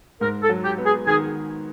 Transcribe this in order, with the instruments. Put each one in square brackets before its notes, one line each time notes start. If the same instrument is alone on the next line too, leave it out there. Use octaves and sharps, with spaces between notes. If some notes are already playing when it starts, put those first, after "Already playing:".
[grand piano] G#2 [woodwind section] A#4
[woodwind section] A4
[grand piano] F#3
[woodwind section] G4
[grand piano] B3
[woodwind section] G#4
[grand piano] D#3 [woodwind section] G#4